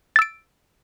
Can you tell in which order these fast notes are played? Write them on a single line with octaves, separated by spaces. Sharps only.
A6 E6 D7